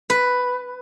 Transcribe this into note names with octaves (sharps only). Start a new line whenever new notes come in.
B4